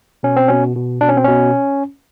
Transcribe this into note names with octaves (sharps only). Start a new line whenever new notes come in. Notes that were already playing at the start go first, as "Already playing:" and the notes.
B2 C#4
C4
B2 C#4
B2
B2 D4
C#4
C4
B2 C#4